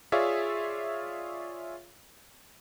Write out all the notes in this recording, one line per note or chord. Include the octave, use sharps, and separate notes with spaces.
F4 G#4 C#5 D5 E5 F5